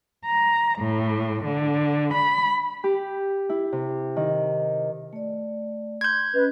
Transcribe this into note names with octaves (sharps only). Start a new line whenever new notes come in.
A#5
A2
D3
B5
G4
E4
C3
D#3
A3 D5
C6 G6 G#6
C#4 B4 D#5